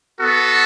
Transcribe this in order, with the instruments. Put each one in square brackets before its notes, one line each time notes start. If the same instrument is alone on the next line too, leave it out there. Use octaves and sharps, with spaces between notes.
[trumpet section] B3 F#4 A4